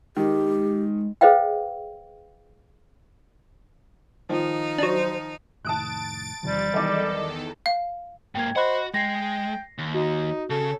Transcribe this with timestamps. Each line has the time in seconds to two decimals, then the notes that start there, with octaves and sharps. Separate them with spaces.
0.17 D#3 G#3 G4
1.21 G#4 B4 C5 D#5 F5 G5
4.29 D#3 F3 D#4
4.78 F#3 D4 C5
5.65 F1 A2 D#3 A5 D#6 F#6 A6 D7
6.43 E2 C3 D#3 F3 G3 A6
6.73 E2 D#3 E3 F#3 A4 D5 D#5 D6
7.66 F5
8.35 G#2 A#3 G5 G#6
8.56 F#4 C5 D#5 F#5 B5 F#6
8.94 G#3 G5 A#6 C7
9.78 D#2
9.94 D#4 F#4
10.50 C#3 A4